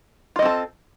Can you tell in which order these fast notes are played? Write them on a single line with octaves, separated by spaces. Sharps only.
F4 D#5 C4 A4